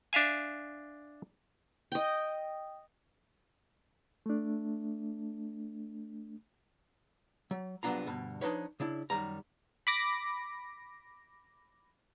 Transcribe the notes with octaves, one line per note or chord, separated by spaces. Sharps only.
D4 E5 F5 G#5
D#5 G5
A3 D4
F#3
C2 F#3 B3 D4 F4 A#5
D2 G2 B2
F3 D4 D#4 B4 C#5
C#3 D4 E4
F#2 D#3 G3 A#5
B5 D6 A#6